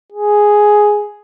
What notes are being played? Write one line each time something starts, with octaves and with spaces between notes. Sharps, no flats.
G#4